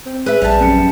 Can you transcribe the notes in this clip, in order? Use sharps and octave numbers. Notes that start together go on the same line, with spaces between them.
C4
G#4 B4 E5
A#1 G3 A5
F#2 C#7